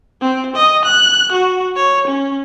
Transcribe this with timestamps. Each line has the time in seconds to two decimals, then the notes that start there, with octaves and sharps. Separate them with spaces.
0.22 C4
0.56 D#5
0.85 F#6
1.32 F#4
1.77 C#5
2.08 C#4